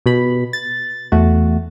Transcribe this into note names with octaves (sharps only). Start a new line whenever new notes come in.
B2 B5
A6
E2 A3 F#4